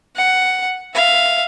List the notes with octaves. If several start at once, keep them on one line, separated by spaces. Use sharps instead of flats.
F#5
E5 F5